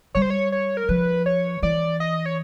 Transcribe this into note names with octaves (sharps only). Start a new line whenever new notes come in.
G3 C#5
C5
C#5
C#5
A#4
F3 B4
C#5
E3 D5
D#5
C#5